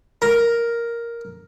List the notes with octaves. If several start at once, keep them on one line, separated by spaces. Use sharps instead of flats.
A#4